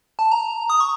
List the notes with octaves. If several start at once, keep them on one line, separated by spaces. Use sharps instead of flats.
A5
A#5
D#6
C#6